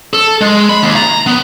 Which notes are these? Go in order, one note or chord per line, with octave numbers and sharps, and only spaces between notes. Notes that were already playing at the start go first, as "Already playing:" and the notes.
A4
G#3
B5
D#2
A#5
B3